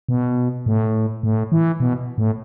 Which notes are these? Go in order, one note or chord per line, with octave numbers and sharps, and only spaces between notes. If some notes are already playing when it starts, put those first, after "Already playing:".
B2
A2
A2
E3
B2
A2